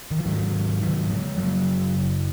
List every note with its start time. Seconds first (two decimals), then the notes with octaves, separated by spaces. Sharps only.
0.11 D#3
0.19 F3
0.26 G#2 D#3 F#3
0.82 D#3 F#3
1.10 F3 G#3
1.37 F#2 C#3 F#3 A#3